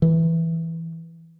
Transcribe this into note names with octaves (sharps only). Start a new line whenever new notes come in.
E3